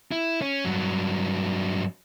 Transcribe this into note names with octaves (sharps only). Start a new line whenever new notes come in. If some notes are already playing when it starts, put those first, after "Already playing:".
E4
C#4
G2 F#3